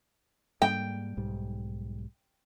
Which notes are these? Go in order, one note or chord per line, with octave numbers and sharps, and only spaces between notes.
G#2 G3 A#3 G5
B1 G#2 G3